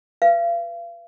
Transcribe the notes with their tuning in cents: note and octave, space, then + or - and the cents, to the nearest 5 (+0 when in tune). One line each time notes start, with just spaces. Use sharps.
B4 +0 F5 -40